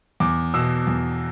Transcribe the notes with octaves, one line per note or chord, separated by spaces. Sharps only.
E2 D6
B2 E6
E2